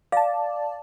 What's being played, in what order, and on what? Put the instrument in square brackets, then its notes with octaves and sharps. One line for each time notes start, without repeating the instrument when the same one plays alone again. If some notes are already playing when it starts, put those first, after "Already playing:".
[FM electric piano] D5 A5 [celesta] F5